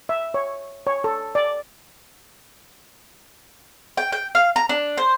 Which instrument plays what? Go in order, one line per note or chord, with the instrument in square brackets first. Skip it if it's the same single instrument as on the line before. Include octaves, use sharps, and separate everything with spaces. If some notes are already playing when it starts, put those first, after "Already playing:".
[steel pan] E5
C#5
C#5
A4
D5
[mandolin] G5
G5
F5
A#5
D4
C5